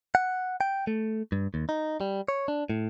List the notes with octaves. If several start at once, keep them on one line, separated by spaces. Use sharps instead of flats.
F#5
G5
A3
G2
D#2
D#4
G3
C#5
D4
A2